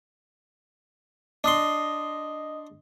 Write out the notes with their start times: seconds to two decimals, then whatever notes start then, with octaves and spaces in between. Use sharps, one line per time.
1.44 D4 D#5 C6 D#6